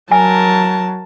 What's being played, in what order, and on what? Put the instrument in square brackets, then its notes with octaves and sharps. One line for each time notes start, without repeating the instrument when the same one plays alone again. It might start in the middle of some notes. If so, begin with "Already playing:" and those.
[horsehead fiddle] F#3 [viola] A#4 [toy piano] G#5 [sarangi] A5